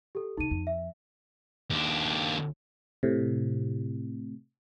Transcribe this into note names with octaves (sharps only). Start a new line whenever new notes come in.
G4 A4
D2 C3 D#4 D#7
F2
E5
D#2 D4
A2 C3